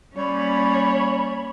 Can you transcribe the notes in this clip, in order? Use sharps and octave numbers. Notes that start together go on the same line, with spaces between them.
G3 A#3 C#4 C#5 B5